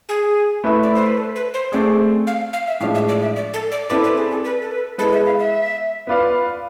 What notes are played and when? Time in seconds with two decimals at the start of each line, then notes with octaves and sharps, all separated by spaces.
0.09 G#4
0.64 A3 E4 B4 E5
0.83 D5
0.95 C5
1.06 B4
1.17 A4
1.36 B4
1.54 C5
1.72 A3 C4 G#4 D5
2.27 F5
2.53 F5
2.67 E5
2.80 A2 F3 G#3 D4 F5
2.95 E5
3.08 D5
3.22 E5
3.36 D5
3.54 A4
3.72 D5
3.90 C4 E4 A4 B4 D5
4.04 B4
4.17 G#4
4.31 A4
4.45 B4
4.62 A4
4.71 B4
4.98 G#3 B3 E4 A4 B4
5.13 E5
5.26 F5
5.39 E5
6.07 B3 F4 B4 D5 F5